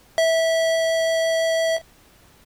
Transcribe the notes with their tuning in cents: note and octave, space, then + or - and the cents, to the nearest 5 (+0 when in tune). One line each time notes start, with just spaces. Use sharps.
E5 -15